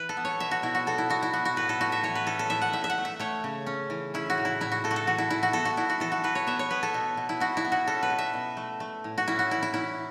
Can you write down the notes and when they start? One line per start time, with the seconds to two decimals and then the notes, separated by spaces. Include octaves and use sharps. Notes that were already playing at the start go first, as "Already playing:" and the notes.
Already playing: E3 B4
0.09 A4
0.17 B3
0.25 C#5
0.40 B2 E5
0.51 F#4
0.63 B2 E4
0.75 F#4
0.87 B3 A4
0.98 E4
1.10 B3 F#4
1.23 E4
1.33 B3 F#4
1.45 F#4
1.56 A2 B4
1.69 A4
1.81 A2 F#4
1.92 E5
2.03 E3 C#5
2.15 B4
2.27 C#4 A4
2.39 A4
2.50 A2 E5
2.62 F#5
2.73 A2 E5
2.84 E5
2.90 F#5
2.98 A3
3.05 E5
3.20 A3 C#5
3.44 C#3
3.66 C#4
3.90 E3
4.14 C#4 E4
4.30 F#4
4.38 A2
4.45 E4
4.61 A2 E4
4.72 F#4
4.84 A3 A4
4.91 F#4
4.96 A4
5.07 E3 F#4
5.18 E4
5.30 E3 E4
5.43 F#4
5.53 B3 A4
5.65 F#4
5.77 B3 E4
5.89 F#4
6.00 E3 A4
6.12 F#4
6.24 E3 B4
6.35 C#5
6.47 B3 E5
6.59 C#5
6.71 B3 B4
6.83 A4
6.94 B2
7.17 B2
7.29 E4
7.40 B3 F#4
7.57 E4
7.65 B3
7.72 F#4
7.87 C#4 A4
8.03 B4
8.10 B2
8.19 E5
8.33 B2
8.57 A3
8.80 A3
9.04 A2
9.18 F#4
9.28 C#4 E4
9.39 F#4
9.51 E3 E4
9.63 E4
9.74 C#4 E4